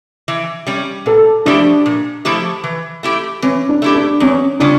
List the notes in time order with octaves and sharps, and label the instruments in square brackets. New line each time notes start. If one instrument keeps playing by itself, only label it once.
[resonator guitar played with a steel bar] E3
G3 C#4
[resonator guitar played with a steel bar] A#2 [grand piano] A4
[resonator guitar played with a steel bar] F3 A3 E4 G4 [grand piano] D4
[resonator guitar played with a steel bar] A#2
F3 A3 E4 G4
E3
A3 E4 G4
[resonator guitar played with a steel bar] E3 [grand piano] C#4
[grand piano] D4
[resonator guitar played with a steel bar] A3 E4 G4
[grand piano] D4
[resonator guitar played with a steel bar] E2 [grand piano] C#4
[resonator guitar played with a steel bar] C#3 G3 C#4 F4 [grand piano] D4